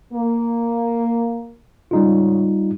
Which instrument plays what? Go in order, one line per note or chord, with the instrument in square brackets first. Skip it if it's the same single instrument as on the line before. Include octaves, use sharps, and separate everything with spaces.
[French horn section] A#3
[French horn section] G#2 C#3 [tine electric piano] G3 D#4 F4